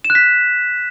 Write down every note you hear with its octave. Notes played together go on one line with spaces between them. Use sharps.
E7
F#6
B6